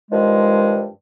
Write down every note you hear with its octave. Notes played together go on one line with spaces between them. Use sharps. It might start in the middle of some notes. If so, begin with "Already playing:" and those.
G2 D#3 F3 G#3